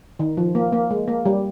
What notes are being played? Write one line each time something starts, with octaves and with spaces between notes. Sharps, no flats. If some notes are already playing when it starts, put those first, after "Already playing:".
D#3
F3
A#3
A#3
G#3
A#3
G3